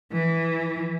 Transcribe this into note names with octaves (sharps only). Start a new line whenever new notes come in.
E3